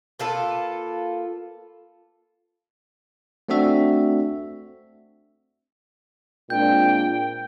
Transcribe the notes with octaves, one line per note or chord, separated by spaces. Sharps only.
A#3 F4 A4 B4
A3 C4 D4 F#4 E5
A#2 G#3 C4 D4 G5 G6